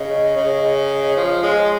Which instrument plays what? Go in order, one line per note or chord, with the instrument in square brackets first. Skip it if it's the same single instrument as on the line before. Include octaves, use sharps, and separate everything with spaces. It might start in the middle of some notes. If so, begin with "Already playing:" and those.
Already playing: [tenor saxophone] C#3 [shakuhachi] D#5
[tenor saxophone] C#3
[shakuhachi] D#5
[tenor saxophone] F3 [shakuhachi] C#5
[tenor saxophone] G#3